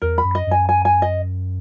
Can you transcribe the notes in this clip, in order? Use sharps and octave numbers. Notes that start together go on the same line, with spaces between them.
E2 A#4
B5
F#2
D#5
F#2 G#5
G#5
G#5
D#5